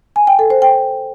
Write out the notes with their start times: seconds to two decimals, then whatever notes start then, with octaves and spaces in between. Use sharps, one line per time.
0.16 G#5
0.27 G5
0.39 A4
0.50 C5
0.62 G5